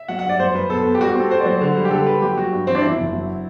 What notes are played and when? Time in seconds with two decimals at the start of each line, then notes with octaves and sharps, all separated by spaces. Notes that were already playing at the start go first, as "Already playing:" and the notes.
Already playing: E5
0.08 F#3 F#5
0.19 F#5
0.24 G2
0.29 D5
0.39 F#2 C5
0.55 F#2 B4
0.70 B2 A4
0.85 B3
0.95 G4
1.00 G3 F#4
1.11 G4
1.15 C4 A4
1.30 F#4 C5
1.40 D5
1.46 F#3 C5
1.61 D3
1.76 G3
1.85 G4
1.91 D3 A4
2.07 D3 B4
2.22 F#3 G4
2.37 F#3 F#4
2.52 G2
2.67 E3 C4
2.75 D4
2.82 E2 E4
2.98 F#1
3.13 F#3